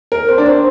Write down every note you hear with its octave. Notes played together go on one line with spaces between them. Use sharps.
A#4
C4
D4
C4